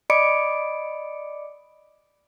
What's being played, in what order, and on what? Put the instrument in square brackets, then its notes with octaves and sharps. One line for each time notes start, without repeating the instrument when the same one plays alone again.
[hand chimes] D5 D#5 B5 D6 C#7 D7